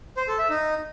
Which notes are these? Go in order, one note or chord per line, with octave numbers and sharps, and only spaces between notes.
C5
A4
E5
D#4